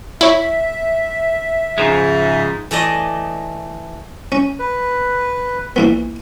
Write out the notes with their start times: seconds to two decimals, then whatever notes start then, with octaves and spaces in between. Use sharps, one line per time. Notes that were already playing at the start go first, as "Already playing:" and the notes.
0.21 E4 C#5 E5
1.78 G#2 C#3 F3 G#3
2.71 E3 A3 D5 D#5
4.32 C#4
4.59 B4
5.76 A#1 E3 B3